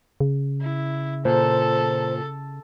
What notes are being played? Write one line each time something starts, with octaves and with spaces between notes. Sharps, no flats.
C#3
E4
A#2 A4 C5